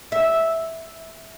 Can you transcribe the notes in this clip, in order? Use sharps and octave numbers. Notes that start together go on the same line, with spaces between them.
E5